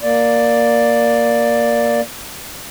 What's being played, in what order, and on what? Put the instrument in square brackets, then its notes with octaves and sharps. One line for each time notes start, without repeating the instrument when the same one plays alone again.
[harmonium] A#3 D5